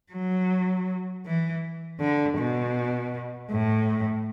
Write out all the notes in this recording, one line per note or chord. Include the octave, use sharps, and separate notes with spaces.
F#3
E3
D3
B2
A2